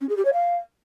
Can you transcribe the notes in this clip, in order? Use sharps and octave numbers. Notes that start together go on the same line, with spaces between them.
C#4
G#4
G4
C#5
F5